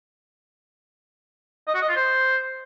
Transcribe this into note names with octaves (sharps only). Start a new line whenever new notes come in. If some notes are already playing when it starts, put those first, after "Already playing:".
D#5
F#4
D#5
F4
C5